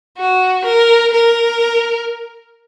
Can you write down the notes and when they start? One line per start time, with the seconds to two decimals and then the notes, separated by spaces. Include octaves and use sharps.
0.18 F#4
0.65 A#4
1.13 A#4